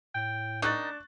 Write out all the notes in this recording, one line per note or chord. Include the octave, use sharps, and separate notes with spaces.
A2 G5
D#3 D4 D#4 C#6 F#6 A6